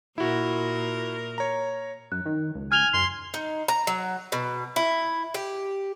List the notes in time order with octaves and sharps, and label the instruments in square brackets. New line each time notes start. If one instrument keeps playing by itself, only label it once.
[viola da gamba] A#2 A#4 [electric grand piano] E4 F#4
[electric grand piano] C#5 A#5
[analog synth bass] F#2 [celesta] F#6
[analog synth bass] D#3
C#2
[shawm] G#5 [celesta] F6 F7 G7
[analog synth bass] F#2 [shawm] C6
[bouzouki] D#4
A#5
F#3
B2
E4
G4